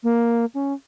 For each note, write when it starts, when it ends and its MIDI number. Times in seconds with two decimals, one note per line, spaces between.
0.03 0.45 58
0.54 0.73 61